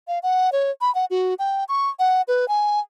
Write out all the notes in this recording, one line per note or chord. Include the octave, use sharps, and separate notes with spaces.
F5
F#5
C#5
B5
F#5
F#4
G5
C#6
F#5
B4
G#5